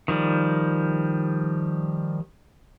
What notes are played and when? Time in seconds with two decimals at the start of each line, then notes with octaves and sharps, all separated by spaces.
0.08 D#3 F3 G3